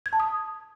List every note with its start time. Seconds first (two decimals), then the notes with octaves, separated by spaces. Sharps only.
0.06 G#6
0.13 A5
0.20 D#6